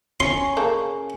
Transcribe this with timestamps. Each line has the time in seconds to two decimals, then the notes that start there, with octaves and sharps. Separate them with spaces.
0.20 C#4 A#5 C6 C#6
0.57 C#3 A#3 A4